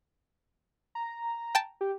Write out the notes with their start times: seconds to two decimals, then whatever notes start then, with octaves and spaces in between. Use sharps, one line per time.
0.95 A#5
1.55 G5 A5
1.81 G4